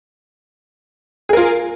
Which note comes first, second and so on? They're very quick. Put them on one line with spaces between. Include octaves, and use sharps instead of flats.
G#4 A#4 F4